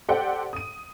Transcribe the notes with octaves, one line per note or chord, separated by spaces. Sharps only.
G4 A4 C5 D5 F#5 G5
D#6 D#7